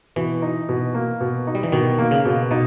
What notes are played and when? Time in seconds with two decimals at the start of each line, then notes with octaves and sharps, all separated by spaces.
0.16 B2 E3
0.42 D#4
0.69 B2
0.94 A#3
1.21 B2
1.47 D#4
1.55 G3
1.63 E3
1.72 B2 D#3
1.98 A#3
2.11 C#3
2.25 B2
2.51 B2 D#4